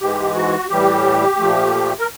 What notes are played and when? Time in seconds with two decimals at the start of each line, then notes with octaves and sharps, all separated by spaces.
0.01 G#2 E3 G#3 G4
0.35 F#4
0.69 A2 E3 G3 G4
1.38 A#2 F3 A3
1.99 A#4